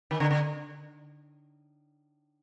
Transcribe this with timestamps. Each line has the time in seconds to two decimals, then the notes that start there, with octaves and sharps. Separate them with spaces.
0.11 D#3
0.20 D3
0.31 D3